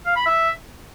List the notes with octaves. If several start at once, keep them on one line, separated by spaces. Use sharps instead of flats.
F5
B5
E5